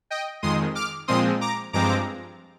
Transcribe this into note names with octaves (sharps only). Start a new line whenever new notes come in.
D#5 G5
F2 D#3 G#3 C6 D#6
D6 F6
A#2 F3 G#3 C4 C6 D#6
A#5 D6
G2 F3 G#3 C4 A#5 D6